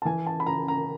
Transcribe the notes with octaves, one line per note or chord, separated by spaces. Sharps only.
A5
E3 G#5
A5
B5
C#3 A#5
A#5